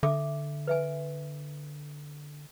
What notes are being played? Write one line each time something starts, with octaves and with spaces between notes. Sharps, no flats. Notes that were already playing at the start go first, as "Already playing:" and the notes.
D3 A4 E5 D6
B4 E5 G#5